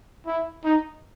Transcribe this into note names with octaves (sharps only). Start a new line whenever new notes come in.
E4
D#4